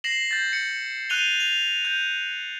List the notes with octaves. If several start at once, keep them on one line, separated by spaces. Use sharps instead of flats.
A#6 C7 E7 F#7
G6 A6
C#7
F#6 D#7 F7 G7
F7
G6